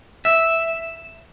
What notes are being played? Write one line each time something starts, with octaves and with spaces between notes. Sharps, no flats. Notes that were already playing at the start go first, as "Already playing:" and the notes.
E5